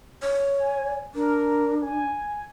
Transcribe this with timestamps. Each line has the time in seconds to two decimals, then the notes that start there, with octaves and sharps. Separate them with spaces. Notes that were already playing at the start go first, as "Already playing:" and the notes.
0.22 C#5
0.59 G#5
1.15 D4 A#4
1.82 G#5